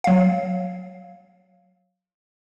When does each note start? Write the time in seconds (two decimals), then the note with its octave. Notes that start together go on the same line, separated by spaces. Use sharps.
0.04 F#3 F5